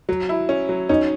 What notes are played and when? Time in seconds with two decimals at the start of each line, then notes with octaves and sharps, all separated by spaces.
0.09 F#3
0.29 E4
0.49 C#4
0.69 F#3
0.89 C#4 D#4